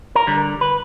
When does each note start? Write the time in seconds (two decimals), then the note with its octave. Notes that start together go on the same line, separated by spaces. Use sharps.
0.15 A#4
0.27 D3 G3
0.61 B4